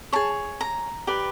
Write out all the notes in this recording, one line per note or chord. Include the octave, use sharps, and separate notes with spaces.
G#4 C#5 A5
A#5
G4 B4 D5